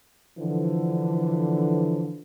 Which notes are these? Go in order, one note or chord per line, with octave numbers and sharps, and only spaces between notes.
D3 E3 F3